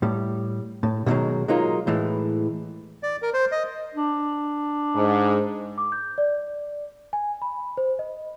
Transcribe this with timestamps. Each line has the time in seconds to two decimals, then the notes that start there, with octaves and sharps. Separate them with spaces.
0.02 A2 G3
0.83 A2
1.06 B2 D3 D#3 F#3 G#3
1.48 F#3 G#3 A#3 D#4 F4
1.87 A2 E3 G#3
3.03 D5
3.22 A#4
3.34 C5
3.52 D#5
3.95 D4
4.95 G#2
5.78 D6
5.92 G6
6.18 D5
7.13 G#5
7.42 B5
7.77 C5
7.99 D#5